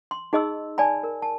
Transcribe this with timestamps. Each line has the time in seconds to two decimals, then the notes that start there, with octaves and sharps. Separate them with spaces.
0.11 C6
0.33 D#4 G#4 D#5 C6 E6
0.78 D5 G#5 A5 B5
1.03 A#4
1.22 A5